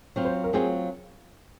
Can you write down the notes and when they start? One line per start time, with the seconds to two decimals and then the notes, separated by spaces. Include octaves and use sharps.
0.16 F#3 C4 F4
0.25 C5
0.44 A#4
0.53 F#3 C4 F4 G#4